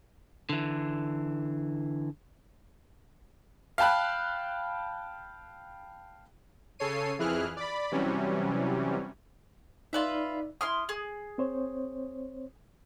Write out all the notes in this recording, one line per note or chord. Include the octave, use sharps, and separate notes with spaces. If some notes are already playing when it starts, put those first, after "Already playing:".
D3 E3
F5 G5 A5 B5 F#6
C#3 A4 C#5 C7 D#7
F2 E3 E4 G#4 F6 F#6
D5 B5
C3 E3 F#3 G3 C#4
D#4 F4 B4 D5 E5
E4 C6 D#6 F6
G#4
C4 C5 C#5